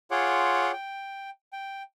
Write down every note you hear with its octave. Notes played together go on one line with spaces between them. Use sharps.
F4 G#4 C#5 F#5 C6 D6
G5
G5